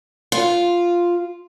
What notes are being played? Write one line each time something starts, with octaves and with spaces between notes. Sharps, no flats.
F4